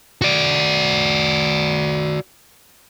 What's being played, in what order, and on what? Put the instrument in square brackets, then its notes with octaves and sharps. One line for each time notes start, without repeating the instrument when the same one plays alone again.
[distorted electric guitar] F#4 D5